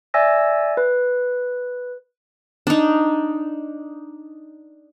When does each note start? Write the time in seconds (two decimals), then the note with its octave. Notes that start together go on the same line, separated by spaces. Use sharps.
0.14 D5 E5 G#5 E6 A#6
0.77 B4
2.67 D4 D#4